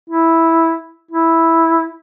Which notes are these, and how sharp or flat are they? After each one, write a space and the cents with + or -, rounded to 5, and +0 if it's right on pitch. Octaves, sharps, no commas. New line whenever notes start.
E4 -5
E4 -5